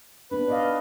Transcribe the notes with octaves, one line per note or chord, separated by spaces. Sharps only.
B3 D4 B4
D5 D#5 F5